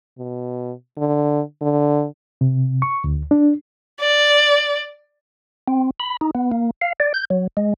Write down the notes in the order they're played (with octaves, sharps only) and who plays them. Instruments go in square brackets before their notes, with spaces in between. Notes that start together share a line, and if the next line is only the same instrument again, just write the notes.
[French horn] B2
D3
D3
[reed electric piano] C3
C#6
D2
D4
[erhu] D5
[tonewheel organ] C4
B5
D#4
B3
A#3
F5
D5
G6
F#3
G#3